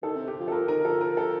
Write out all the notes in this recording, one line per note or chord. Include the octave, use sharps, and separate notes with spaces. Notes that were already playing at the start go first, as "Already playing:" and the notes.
D#3 A4
C3
G4
F3
A4
F3 A#4
D#3 A#4
F3 A4
A#4
A4